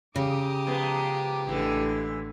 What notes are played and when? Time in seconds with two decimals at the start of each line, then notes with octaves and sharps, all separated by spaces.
0.16 C#3 G4 A#5 D6 D#6
0.67 F3 G#3 B3
1.47 A1 D3 E3 G#3